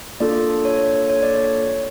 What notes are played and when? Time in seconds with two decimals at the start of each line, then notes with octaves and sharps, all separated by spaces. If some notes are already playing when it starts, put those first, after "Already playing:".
0.20 A#3 D4 F4 A4 D5
0.65 C#5
0.78 C#5
1.10 C#5
1.23 D5
1.36 C#5